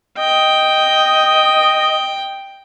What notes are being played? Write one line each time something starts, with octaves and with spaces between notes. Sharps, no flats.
D#5 G5